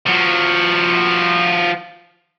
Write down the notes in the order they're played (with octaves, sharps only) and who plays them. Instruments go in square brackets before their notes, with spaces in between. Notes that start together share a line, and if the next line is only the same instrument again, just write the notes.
[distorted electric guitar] F3 F#4